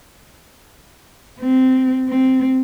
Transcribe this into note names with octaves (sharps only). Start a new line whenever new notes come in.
C4
C4